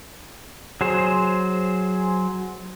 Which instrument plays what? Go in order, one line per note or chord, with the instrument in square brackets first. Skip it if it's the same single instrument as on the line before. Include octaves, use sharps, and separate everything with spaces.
[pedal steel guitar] F#3 G#4 C5